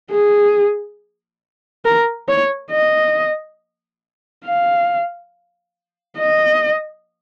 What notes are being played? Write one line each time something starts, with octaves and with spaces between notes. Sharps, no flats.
G#4
A#4
C#5
D#5
F5
D#5